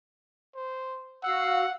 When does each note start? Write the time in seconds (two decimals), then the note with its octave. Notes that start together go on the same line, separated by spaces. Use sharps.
0.55 C5
1.23 F#4 F5 F#5 E6